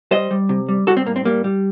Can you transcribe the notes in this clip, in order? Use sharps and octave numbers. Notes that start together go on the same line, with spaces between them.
G3 C5 D#5
G3
C3
G3
G3 F#4 A4
C4
A2 A#3
C4
G3 A#3
G3